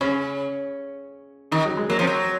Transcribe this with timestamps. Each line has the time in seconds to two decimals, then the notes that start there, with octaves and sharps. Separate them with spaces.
0.01 C#3 C#4
1.51 D#3 D#4
1.65 F#3
1.77 G#3
1.89 F#3 A#3
1.99 F3
2.02 C4
2.07 F#3